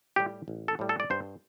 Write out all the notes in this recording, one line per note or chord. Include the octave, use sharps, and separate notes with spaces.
A2 G3 G4
A1
A4
A2 G3
A4
D5
G2 C5